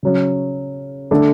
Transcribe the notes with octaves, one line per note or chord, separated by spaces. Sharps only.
C#3 F#3 C#4
D3 A3 D4 A4